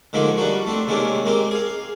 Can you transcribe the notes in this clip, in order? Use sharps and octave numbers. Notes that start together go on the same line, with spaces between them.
D3 D#3 F3 G#3 A#3 D#4
G3 D4 D#4 F#4
A3 C4 D4
C3 D#3 G#3 A#3 C#4 D4
G#3 A#3 C4 G4
G#4 F5